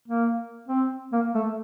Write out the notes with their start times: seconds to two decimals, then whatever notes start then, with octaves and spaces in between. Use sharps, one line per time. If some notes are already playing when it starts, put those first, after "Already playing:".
0.08 A#3
0.68 C4
1.13 A#3
1.35 A3